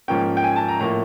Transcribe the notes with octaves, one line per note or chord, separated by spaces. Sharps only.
G#2 F3 A#3 C#4 G5
G5
G#5
A5
A#5
A2 F3 A#3 A#5